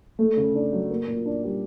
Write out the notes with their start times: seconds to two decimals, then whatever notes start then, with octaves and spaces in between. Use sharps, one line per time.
0.19 A3
0.37 C#3
0.55 D4
0.72 F#3
0.90 A#3
1.07 A#2
1.25 D4
1.44 G3